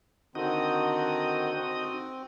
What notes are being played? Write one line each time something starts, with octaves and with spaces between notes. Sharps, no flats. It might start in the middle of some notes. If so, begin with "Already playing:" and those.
D3 D#3 C4 D#4 F#4 D#6
C4